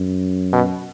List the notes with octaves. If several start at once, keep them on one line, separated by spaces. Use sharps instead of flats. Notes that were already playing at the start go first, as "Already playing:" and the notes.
Already playing: F#2
B2